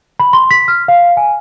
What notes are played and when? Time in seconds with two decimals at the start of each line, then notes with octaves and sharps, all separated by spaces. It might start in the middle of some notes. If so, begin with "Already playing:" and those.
0.20 B5
0.33 C6
0.51 B6
0.68 F6
0.88 F5
1.17 G#5